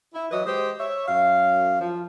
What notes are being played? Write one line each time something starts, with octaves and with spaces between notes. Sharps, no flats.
E4
E3 F#3 B4 D#5
G#3 G4 C5
C#5 E5
F#2 F5
F3